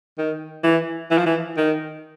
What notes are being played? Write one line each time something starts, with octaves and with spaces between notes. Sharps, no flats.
D#3
E3
E3
F3
E3
D#3